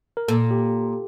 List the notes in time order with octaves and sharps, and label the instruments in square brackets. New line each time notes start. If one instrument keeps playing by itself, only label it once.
[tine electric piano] A#4
[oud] A#2 [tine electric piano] A4
[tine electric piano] G4